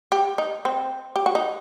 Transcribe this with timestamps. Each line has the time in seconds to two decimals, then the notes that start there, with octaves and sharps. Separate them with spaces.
0.12 G4
0.38 D#4
0.65 C4
1.16 G4
1.26 F#4
1.35 D#4